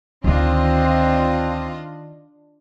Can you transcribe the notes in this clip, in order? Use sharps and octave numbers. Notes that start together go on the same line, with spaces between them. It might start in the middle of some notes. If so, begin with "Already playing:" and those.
D2 D3 D#3 C4 D4 F4 D#5